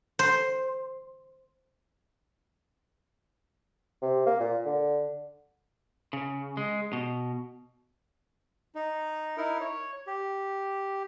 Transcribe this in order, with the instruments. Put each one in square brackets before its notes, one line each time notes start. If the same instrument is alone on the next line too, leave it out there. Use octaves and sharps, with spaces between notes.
[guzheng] C5
[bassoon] C3
A#3
A#2
D3
[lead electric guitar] C#3
G#3
B2
[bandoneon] D#4
D#4 E4 A#4
C#5
G4